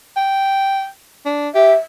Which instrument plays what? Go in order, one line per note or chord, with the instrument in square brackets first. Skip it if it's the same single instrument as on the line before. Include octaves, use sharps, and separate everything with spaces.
[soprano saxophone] G5
D4
[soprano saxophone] G4 [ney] E5